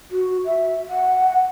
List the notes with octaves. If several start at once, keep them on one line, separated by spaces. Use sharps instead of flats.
F#4
E5
F#5